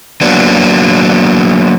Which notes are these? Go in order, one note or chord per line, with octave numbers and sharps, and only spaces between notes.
F#3 A#3 B3 D4